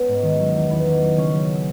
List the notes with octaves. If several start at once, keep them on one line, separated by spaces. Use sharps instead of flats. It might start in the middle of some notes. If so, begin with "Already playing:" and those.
Already playing: B3 C#4
G#2
D#3
F#3
E2
E2 B3
D#3
F#3
C#3 C#4
F#3